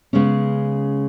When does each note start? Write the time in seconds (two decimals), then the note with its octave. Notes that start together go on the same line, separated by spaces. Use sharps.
0.13 C#3 G#3 B3 C#4